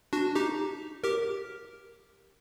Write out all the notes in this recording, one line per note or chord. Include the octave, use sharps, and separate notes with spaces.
D4 F#4
D#4 G4
G4 A#4